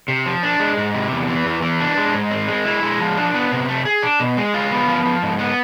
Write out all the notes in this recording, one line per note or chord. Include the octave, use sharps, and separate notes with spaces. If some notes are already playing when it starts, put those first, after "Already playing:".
C3
F3
D4
G#3
G#2
C3
E2
E3
E2
E3
D4
G#3
G#2
C4
G#3
E4
G#3
F3
D4
B3
C3
A3
G#4
D4
B2
G#3
F4
B3
F3
F3
G#2
B3